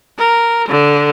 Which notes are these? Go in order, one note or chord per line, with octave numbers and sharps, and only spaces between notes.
A#4
D3